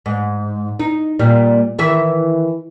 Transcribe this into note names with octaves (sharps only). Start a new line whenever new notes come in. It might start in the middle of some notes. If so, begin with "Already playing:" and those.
G#2
D#4
A#2 G3
D#3 E3 E5